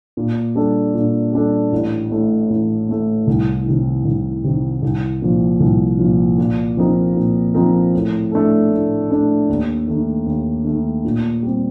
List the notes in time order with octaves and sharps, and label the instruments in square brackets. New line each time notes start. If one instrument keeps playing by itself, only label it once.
[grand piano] A#2
G3 D4 A4
A#2
G3 D4 A4
A1
A2 A3
A1
A2 A3
C2
C3 D#3
C2
C3 D#3
C2
A#2 F3
C2
A#2 F3
A#2
F3 C4 D#4 A#4
A#2
F3 C4 D#4 A#4
A2
A3 D4 A4
A2
A3 D4 A4
D#2
D#3 A3
D#2
D#3 A3
A#2
G3 C4